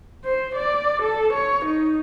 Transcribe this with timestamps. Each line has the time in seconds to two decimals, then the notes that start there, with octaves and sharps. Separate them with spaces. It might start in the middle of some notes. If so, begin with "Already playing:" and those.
0.24 C5
0.55 D5
1.02 A4
1.33 C#5
1.65 D#4